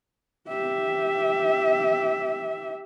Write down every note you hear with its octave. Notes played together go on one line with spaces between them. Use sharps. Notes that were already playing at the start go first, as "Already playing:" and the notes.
G4 E5